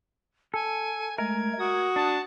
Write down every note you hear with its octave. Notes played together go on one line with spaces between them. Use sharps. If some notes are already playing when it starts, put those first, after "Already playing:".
A4 G#5
G#3 A3 A#4 G#6
F#4 D#6
D4 A5